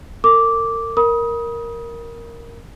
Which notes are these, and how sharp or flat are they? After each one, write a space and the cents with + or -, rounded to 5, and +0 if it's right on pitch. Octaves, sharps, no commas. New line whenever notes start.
A#4 -40 D6 -5
A#4 +0 B5 -35 D#6 +20